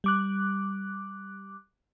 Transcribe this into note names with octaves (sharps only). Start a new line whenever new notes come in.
G3 D6 F#6